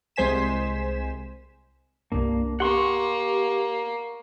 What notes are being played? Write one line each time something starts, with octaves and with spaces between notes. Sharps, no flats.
C2 G#3 C5 G#5 B6 E7
C2 G2 A#3 D4
A#3 G4 F#5 C6 C#6